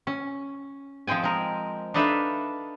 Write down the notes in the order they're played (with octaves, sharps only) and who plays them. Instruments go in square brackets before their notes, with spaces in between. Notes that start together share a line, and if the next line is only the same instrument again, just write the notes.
[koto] C#4
F3 G#3 C4 G5 G#5
G#3 A#4
D4 D#4 A4 B4 E5 F5